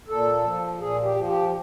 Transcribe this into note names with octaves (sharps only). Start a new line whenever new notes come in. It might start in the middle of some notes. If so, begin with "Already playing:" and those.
A#2 A4
F3
A#2 G#4
G4
F3
G4